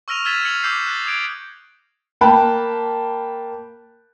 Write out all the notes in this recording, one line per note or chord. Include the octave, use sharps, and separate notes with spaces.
C#6 E6 F6 A#6 D#7 F7
E6 F6 G#6 A6 B6 E7
E6 F6 C#7 F7 F#7
D6 E6 G6 C7
F#6 A6
D#6 G#6 D7
A#3 G5 A5 B5 F#6